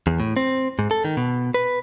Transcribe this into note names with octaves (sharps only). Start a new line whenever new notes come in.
E2
A2
C4
G#2
A4
D#3
B2
B4